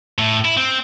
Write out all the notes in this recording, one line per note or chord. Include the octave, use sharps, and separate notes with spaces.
A2
E4
C4